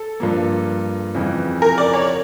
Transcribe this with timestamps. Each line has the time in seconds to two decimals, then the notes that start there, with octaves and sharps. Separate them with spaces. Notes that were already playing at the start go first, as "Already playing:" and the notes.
Already playing: A4
0.20 G2 F3 A#3
1.15 F2 C#3 E3
1.62 A#4
1.78 D5
1.93 C#5